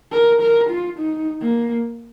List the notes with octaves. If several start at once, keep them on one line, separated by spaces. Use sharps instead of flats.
A#4
A#4
F4
D#4
A#3